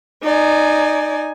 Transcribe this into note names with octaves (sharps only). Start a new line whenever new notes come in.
D#4 D5 G#5